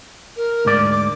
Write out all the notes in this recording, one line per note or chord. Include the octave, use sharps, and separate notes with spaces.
A#4
D2 G#2 D5
D6